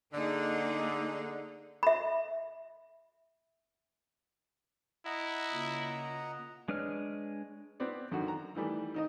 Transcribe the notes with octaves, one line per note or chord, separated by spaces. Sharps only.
D3 A#3 D#4 G#4
E5 B5
E4 D#5 F#5 A#5
C#3 A#3 F4
G#3 D4 B4 C#5 F6
B3 C4 D5
F#2 D3 D#3 F#4
A#5
D#3 E3 G3 A3
D#3 D#4 D#5